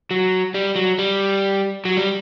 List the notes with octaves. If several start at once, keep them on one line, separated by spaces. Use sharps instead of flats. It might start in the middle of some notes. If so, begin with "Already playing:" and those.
F#3
G3
F#3
G3
F#3
G3